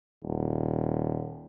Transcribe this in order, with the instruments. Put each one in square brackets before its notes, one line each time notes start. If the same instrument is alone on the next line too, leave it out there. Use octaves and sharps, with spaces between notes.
[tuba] D#1